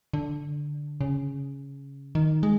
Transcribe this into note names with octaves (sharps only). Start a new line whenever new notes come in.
D3
C#3
D#3
G#3